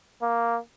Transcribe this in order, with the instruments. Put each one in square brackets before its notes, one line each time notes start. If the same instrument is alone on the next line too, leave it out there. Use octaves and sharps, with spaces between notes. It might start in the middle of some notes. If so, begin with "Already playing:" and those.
[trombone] A#3